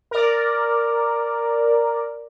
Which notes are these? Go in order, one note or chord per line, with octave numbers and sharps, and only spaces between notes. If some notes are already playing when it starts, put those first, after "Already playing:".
A#4 D5